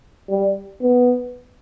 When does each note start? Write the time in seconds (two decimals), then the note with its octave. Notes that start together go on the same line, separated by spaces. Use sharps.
0.29 G3
0.81 B3